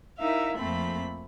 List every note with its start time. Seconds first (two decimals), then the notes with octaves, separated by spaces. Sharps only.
0.17 D#4 E4 A#4 E5 F5
0.56 F2 F3 A3 A#3 C4 B5